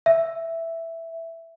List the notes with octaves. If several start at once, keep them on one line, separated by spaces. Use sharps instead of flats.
E5